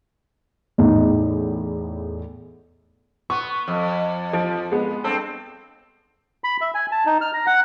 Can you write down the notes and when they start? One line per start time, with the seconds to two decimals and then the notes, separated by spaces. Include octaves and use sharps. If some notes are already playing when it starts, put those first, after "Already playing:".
0.78 E2 A2 D#4
3.30 B3 C#6
3.68 F2
4.33 F3 D7
4.71 G#3 B3
5.04 G2 C4 A4
6.44 B5
6.61 E5
6.74 G#5
6.92 A5
7.06 D#4
7.21 F6
7.34 A#5
7.47 F#5